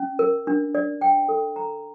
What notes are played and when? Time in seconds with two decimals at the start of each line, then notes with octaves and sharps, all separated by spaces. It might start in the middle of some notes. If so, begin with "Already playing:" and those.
Already playing: C#4
0.19 A#4
0.47 D4
0.75 D5
1.01 G5
1.28 A4
1.56 A#5